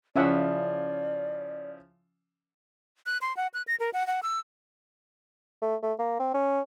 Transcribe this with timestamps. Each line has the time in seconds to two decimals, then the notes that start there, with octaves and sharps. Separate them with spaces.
0.16 C#3 F3 C#4 E4 D5 E5 F#5
3.06 F#6
3.21 C6
3.37 F#5
3.54 F#6
3.67 A#6
3.80 A#4
3.93 F#5
4.07 F#5
4.23 E6
5.62 A3
5.83 A3
5.99 A#3
6.19 C4
6.34 C#4